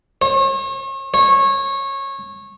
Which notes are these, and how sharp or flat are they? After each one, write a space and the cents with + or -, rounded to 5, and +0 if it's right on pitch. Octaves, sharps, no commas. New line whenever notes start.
C#5 -40
C#5 -20